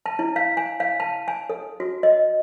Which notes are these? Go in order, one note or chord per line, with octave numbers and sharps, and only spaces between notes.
A5
E4
F5
G#5
F5
A5
G#5
A4
F#4
D#5